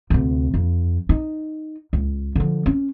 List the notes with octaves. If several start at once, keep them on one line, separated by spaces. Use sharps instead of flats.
D2 C3
F2
D#4
C#2
D3 F3
C#4